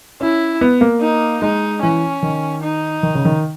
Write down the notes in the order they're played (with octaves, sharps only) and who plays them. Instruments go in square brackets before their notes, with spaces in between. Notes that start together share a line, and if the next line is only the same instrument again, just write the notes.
[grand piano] C#4 [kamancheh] E4
[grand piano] B3
A#3
[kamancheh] D#4
[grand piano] G#3 [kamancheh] D#4
[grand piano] E3 [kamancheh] C#4
[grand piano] D#3
[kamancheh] D#4
[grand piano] D#3
C#3
D#3